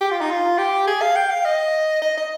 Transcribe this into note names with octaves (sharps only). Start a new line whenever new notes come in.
G4
F4
D#4
F4
G4
G#4
F5
G5
F5
D#5
D#5
D#5